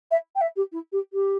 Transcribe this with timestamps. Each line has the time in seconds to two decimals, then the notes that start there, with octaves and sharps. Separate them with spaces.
0.11 E5
0.35 G5
0.41 E5
0.56 G4
0.72 E4
0.92 G4
1.13 G4